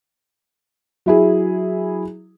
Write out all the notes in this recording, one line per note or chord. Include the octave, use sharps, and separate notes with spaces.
F#3 E4 G#4